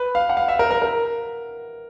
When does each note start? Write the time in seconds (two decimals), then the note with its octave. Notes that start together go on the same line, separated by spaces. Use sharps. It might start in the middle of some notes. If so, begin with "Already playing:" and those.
Already playing: B4
0.15 F5
0.30 F#5
0.37 F5
0.48 E5
0.59 A#4
0.71 A#4
0.82 A#4